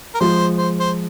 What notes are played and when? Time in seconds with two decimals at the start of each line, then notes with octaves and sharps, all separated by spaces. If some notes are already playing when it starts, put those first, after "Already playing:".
0.14 A#4
0.20 F3 G#3 F4 C5
0.58 C5
0.80 C5